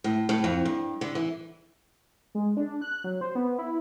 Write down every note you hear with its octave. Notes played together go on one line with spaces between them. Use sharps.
A2
A2
F2
G2
D3
E3
G#3
D4
F#6
F#3
C5
B3
E4